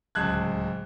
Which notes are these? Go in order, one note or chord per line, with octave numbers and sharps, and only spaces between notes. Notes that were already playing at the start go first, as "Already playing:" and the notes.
D1 C#2 A5 F#6 G#6